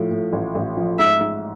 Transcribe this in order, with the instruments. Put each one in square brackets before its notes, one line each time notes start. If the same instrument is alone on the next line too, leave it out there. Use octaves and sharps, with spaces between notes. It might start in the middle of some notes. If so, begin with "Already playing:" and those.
Already playing: [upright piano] A2 F3
A2
A1
A1
F3
[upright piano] G#2 [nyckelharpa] E5
[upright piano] G#2